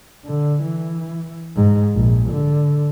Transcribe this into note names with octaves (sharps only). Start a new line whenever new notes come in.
D3
E3
G#2
A#1
D3